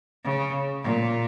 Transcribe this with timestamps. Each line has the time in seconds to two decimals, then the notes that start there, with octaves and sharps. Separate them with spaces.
0.25 C#3
0.84 A#2